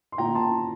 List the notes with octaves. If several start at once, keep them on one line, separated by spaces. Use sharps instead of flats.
C6
A#2 G5 A#5
A5 C6